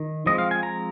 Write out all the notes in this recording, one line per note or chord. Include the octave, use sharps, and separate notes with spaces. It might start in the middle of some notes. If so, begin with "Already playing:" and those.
Already playing: D#3
F3 G#3 C4 D#5
F5
G#5
A#5